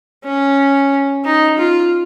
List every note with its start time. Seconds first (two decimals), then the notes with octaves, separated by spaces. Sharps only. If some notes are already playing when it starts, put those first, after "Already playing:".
0.25 C#4
1.25 D#4
1.58 F4